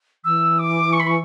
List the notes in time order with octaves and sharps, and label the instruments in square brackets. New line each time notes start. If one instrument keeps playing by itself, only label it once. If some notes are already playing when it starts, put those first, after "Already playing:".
[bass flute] E3 [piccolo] E6
[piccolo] D6
C#6
B5
C#6